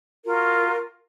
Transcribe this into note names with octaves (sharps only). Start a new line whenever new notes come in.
F4 F#4 A#4